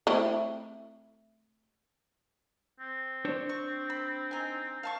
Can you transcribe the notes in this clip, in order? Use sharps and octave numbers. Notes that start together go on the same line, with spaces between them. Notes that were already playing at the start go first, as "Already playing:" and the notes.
A3 C4 E4
C4
D4 C5 C#5
C#6
B5
D#4 G#5
F5 A5 C#6